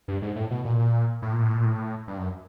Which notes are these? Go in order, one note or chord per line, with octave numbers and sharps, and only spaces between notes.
G2
G#2
A2
B2
A#2
A2
A#2
A2
A#2
A2
G2
F#2